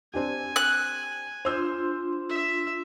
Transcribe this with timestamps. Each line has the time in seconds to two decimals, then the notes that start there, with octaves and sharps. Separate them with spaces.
0.14 C4 D4 G4 G#5
0.56 F#6
1.45 D4 F4 C5 C6 E6 G6
2.30 E5